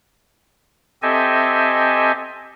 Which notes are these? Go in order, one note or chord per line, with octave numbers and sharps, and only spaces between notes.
C4 G4 A4 D#5 E5 G#5